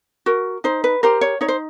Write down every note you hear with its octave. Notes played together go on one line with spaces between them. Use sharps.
F#4 A#4
D#4 C5
B4
G4 A#4 C5
C#5
D#4 C#5
C5